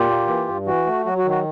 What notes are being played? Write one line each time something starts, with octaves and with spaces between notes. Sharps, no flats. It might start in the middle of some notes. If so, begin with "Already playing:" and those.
Already playing: A#2 F4 G4
A#3
E3
G2
E3 F#4
A3
F#3 F#4
F#4
D#3
F#4